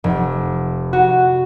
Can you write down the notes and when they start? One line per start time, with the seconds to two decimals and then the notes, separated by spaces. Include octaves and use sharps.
0.04 F1
0.93 F#4